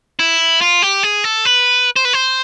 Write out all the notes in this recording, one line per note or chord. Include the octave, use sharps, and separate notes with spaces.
E4
F4
G4
G#4
A4
B4
C5
B4
C5